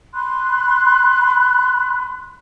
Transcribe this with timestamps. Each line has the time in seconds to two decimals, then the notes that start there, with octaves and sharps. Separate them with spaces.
0.14 B5 C6 F#6